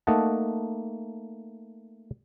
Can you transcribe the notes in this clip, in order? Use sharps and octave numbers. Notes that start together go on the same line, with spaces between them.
A3 A#3 D#4 D#5 F#5 A5